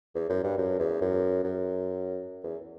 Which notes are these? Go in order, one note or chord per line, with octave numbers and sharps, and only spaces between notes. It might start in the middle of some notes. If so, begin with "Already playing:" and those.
E2
F#2
G2
F#2
E2
F#2
F#2
E2